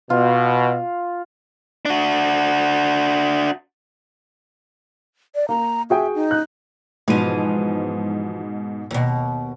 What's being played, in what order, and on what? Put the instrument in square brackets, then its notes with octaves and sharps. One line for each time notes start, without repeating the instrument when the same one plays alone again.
[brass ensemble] B2 [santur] F4
[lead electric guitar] D4 F#4
[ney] D5
[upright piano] A#3 [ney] A#5
[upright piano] F#4 G#4 G5 [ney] E5
[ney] D#4
[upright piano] F#6
[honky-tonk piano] G#2 B2 D#7 [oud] E3 F3
[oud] D#2 B2